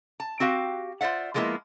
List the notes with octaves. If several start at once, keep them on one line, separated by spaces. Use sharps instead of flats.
A5
C4 F#4 G4 F5
F4 C5 D5 E5 F#5
F3 G3 G#3 A#3 B3 E4